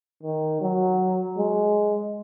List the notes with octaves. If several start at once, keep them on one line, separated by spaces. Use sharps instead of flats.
D#3
F#3
G#3